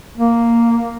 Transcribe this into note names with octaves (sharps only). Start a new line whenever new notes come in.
A#3